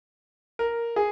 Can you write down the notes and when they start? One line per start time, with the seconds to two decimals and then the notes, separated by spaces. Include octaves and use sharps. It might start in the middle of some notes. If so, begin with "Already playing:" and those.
0.59 A#4
0.96 G#4